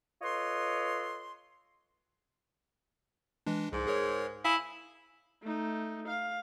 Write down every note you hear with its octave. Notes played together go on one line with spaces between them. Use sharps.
F4 A4 B4 C#5 D#5 C6
E3 G#3 D4
C2 G#2
G#4 A#4 C#5
E4 F5 G#5 D#6
A3 D#4
F5